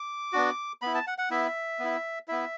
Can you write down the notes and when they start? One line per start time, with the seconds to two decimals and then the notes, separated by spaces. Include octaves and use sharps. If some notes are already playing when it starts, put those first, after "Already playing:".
Already playing: D6
0.33 B3 D4 F#4
0.82 B3 E4 B5
0.94 A5
1.07 F#5
1.18 F#5
1.30 B3 E4 E5
1.79 B3 E4
2.28 B3 E4 E5